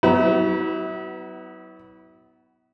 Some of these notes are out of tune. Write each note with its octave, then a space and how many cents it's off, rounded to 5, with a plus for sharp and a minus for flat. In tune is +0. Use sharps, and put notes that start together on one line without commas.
F#3 +30 B3 +10 E4 -30